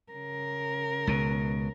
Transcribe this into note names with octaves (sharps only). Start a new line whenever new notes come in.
C#3 A#4
C#2 B2